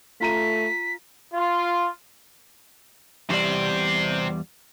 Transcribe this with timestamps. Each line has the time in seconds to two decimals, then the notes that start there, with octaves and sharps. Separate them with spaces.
0.21 A3 F4 A#5 B6 D#7
1.34 F4
3.30 E2 G3 G4 C5 D5